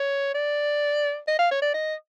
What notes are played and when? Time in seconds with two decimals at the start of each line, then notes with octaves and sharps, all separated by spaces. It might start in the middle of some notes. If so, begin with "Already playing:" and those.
Already playing: C#5
0.35 D5
1.28 D#5
1.39 F5
1.51 C#5
1.62 D5
1.74 D#5